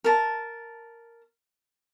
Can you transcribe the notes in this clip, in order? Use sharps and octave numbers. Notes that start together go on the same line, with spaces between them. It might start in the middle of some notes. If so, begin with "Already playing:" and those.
A#4 A5